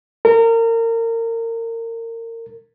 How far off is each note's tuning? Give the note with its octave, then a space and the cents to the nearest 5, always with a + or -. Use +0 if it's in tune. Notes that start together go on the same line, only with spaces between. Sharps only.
A#4 -30